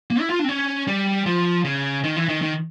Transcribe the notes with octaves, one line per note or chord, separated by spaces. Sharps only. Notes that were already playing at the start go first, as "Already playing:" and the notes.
A#3
E4
F4
D4
C4
C#4
G3
F3
C#3
D#3
E3
D#3
D#3